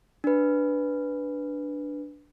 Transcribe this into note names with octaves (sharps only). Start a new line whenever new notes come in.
D4 B4